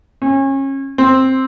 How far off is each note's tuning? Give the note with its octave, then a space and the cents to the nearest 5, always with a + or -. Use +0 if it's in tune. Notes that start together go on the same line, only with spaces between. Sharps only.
C#4 -30
C4 +5